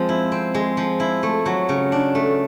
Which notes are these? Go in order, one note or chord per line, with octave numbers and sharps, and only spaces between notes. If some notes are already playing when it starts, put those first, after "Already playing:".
Already playing: F3 G#3 C4
E4
C4
G#3
F3
E4
A3
F#3
C#3
D4
A3